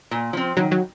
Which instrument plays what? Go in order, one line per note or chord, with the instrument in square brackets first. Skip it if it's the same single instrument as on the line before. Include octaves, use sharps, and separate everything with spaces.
[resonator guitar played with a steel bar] A#2
F3 C4
[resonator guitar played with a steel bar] D#3 [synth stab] F#3
[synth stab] F#3